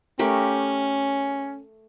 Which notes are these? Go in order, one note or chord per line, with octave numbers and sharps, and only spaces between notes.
A3 C#4 G4 A#4